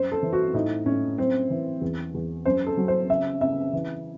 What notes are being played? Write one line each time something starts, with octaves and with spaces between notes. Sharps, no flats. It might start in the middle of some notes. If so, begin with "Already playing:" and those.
Already playing: F#2 C5
A4
E3
F#4
A2 D#4
A2 C#4
F#2 C4
E3
E2
E2
F#2 C5
A4
F#3
C5
C#3 E5
C#3 E5
E3